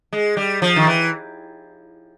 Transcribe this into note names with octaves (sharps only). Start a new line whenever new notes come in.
G#3
G3
F3
D#3
E3